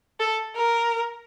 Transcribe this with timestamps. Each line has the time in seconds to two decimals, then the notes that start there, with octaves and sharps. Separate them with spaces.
0.20 A4
0.56 A#4